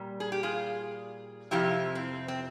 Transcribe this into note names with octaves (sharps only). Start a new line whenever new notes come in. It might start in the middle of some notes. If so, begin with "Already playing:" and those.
Already playing: A#2 G3
G#4
G4
F4 G#4
F2 C3 F3 E4 G4
C4
C4